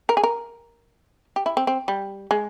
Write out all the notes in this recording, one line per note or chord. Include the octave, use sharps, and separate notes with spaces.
A#4
G#4
A#4
G4
E4
C4
C4
G3
G#3